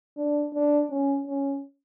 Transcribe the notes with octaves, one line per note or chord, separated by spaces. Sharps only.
D4
D4
C#4
C#4